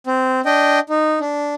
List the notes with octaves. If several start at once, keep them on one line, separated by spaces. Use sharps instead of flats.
C4
D4 D#5 G5
D#4
D4